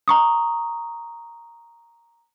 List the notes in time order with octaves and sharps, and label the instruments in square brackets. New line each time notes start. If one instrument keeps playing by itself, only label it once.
[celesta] A#5 C#6 D#6